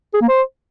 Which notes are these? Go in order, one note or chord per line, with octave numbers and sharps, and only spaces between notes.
G#4
A#3
C5